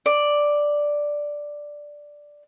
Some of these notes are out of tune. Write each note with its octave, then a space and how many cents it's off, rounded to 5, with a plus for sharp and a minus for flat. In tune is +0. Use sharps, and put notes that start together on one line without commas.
D5 +0